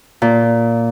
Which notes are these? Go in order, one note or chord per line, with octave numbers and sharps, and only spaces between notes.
A#2